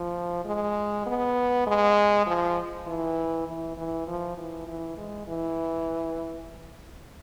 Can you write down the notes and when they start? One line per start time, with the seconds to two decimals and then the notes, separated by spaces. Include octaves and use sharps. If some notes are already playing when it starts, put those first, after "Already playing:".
Already playing: F3
0.46 G#3
1.06 B3
1.67 G#3
2.27 F3
2.87 E3
3.47 E3
3.77 E3
4.07 F3
4.38 E3
4.68 E3
4.97 G#3
5.28 E3